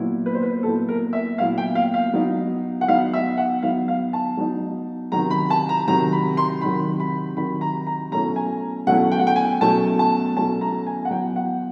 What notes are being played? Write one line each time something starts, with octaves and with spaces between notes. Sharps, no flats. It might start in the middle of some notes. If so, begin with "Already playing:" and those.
Already playing: A#2 F#3 B3 E4
B4
C5
B4
A#2 F#3 B3 E4 A4
A#4
E5
A#2 F#3 B3 E4 F5
G5
F5
F5
F#3 B3 D#4
F#5
F#3 B3 D#4 F5
E5
F#5
F#3 B3 D#4 F5
F5
A5
F#3 B3 D#4
C3 D#3 F#3 A#5
B5
A5
A#5
C3 D#3 F#3 A#5
B5
C6
C3 D#3 F#3 B5
B5
C3 D#3 F#3 B5
A#5
A#5
B2 F#3 A3 C#4 E4 A#5
G#5
B2 F#3 A3 C#4 E4 F#5
G5
F#5
G5
G#5
B2 F#3 A3 C#4 E4 A5
A5
B2 F#3 A3 C#4 E4 A5
A#5
G#5
F#5
F#3 B3 E4 G5
F#5